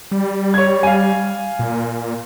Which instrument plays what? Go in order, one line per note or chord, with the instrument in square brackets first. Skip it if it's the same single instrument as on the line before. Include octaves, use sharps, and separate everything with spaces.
[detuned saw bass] G3
[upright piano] C#5 G#6
F5 G#5
[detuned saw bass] A#2